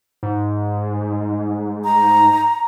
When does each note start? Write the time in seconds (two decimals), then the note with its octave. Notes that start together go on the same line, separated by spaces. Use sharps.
0.23 G#2
1.84 A#5